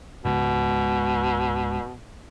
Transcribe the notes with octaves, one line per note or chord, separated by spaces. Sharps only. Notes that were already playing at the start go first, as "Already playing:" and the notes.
C#2 G#2 B2